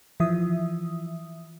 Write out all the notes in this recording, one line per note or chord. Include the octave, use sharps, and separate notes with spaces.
E3 F3 E5 D#6